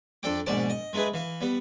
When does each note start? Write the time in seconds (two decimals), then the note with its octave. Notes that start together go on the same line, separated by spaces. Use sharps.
0.23 F2 D4 A4 G5 D6
0.46 A#1 G#2 B2 D5 A5 D6
0.70 D#5
0.93 G#3 A3 D#4 G#4 B4
1.14 E3 F5
1.41 G3 B3